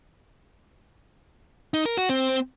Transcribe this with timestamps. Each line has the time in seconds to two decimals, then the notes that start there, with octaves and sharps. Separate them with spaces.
1.74 D#4
1.86 A#4
1.97 F#4
2.09 C4